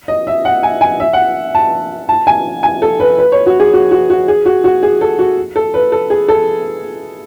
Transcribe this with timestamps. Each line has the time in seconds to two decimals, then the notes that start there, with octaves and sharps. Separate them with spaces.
0.08 D#5
0.27 E5
0.45 F#5
0.63 G#5
0.81 G#5
1.00 E5
1.13 F#5
1.55 A5
2.09 A5
2.27 G#5
2.63 G#5
2.82 A4
3.00 B4
3.18 B4
3.32 C#5
3.46 F#4
3.60 G#4
3.73 F#4
3.91 F#4
4.10 F#4
4.28 G#4
4.46 F#4
4.64 F#4
4.83 G#4
5.01 A4
5.19 F#4
5.56 A4
5.74 B4
5.92 A4
6.10 G#4
6.29 A4